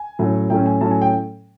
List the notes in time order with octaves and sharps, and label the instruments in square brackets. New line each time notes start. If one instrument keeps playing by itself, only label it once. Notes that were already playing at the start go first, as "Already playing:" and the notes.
Already playing: [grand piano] G#5
A2 F#3 A3 C#4
A2 F#3 A3 C#4 G5
G#5
A2 F#3 A3 C#4 A5
G#5
G5